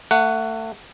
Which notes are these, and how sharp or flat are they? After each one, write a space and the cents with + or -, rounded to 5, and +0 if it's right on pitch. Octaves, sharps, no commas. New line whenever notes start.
A3 +30 F#5 +0